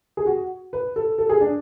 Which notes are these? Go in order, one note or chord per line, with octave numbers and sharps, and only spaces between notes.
G#4
F#4
B4
A4
A4
G#4
D4